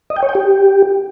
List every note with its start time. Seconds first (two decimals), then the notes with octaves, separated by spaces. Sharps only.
0.10 D#5
0.16 G5
0.23 C#5
0.29 G5
0.35 G4